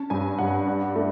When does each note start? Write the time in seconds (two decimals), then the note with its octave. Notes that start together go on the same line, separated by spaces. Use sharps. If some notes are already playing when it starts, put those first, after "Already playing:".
Already playing: C#4 A5
0.10 G2 G#5
0.39 G2 F#5
0.67 D4
0.96 A3